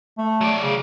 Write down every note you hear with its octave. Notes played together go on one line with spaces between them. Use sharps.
A3
F#3 D5
C#3